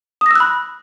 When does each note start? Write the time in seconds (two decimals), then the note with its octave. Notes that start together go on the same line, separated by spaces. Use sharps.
0.21 D#6
0.26 A#6
0.31 E6
0.36 F#6
0.40 B5